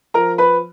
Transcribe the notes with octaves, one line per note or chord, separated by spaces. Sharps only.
F3 A#4 A#5
B4 B5